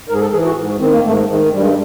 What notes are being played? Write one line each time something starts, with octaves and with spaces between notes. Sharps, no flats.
G#2 A#4
G#4
A4
E3 G#4
F#4
G#2
D#3 C4
A#3
G#2 A3
D#3 G#3
G2 G3
G#3
G3